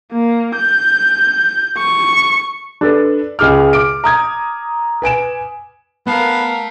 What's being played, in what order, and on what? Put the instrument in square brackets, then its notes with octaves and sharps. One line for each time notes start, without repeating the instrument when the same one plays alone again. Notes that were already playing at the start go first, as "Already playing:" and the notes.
[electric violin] A#3
G6
C#6
[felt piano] D4 A4 B4
C#2 G#4 D6 F6
D6 D7
A#5 D#6 G#6
B4 G#5 D7 E7
[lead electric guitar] A3 A5 [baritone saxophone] B3 [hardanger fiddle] A#4 F5